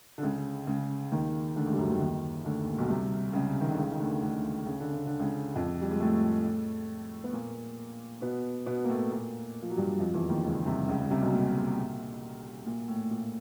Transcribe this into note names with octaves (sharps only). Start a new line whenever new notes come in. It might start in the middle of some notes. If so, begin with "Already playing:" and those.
D3
C#2 C#3
C#2 C#3
D#2 D#3
D2 D3
C#2 C#3
G3
F#2 F#3
D#2 D#3
D#2 D#3
D2 D3
A#2
B1 B2
C2 C3
C#2 C#3
D#3
D3
C#2 C#3
D#3
D2 D3
D2 D3
C#3
D3
C#3
D3
C#2 C#3
F2 F3
G3
G#3
A2 A3
B3
A#2 A#3
B2 B3
B2 B3
A#3
A2 A3
A#2 A#3
F3
F#3
G2 G3
F2 F3
E2 E3
D#2 D#3
C#2 C#3
C2 C3
C#2 C#3
C#2 C#3
C2 C3
B1 B2
A#2
A#2
A#2
A2
A#2